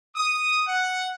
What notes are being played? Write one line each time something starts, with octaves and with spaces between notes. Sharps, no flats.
D#6
F#5